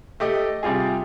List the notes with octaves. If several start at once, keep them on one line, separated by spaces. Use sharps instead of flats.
A3 G4 D#5
C3 G3 F4 G#4